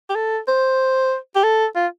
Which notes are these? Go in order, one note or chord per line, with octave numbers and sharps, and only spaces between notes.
G4
A4
C5
G4
A4
F4